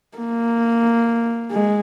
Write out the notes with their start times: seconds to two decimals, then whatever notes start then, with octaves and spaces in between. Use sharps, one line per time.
0.18 A#3
1.52 G#3